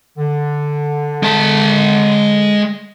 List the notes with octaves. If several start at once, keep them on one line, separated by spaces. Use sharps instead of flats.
D3
G#3 A5